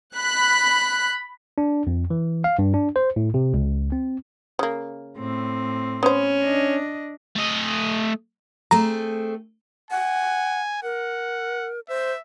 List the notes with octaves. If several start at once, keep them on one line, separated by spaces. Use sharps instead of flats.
B5 F#6
D4
F2
E3
F5
G2
D4
C5
A2
C3
C#2
C4
C#3 A#3
A2 C4
B3 C#4 C5
D4 D#5
A3 D#5
A3 C4 G#4 A#5
F#5 G#5
A#4 F#5
C5 E5